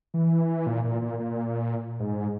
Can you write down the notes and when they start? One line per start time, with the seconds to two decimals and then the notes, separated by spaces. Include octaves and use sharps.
0.14 E3
0.67 A#2
0.84 A#2
1.02 A#2
1.19 A#2
2.00 G#2